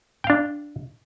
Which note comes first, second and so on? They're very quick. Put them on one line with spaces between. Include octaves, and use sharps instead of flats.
G5 F5 D4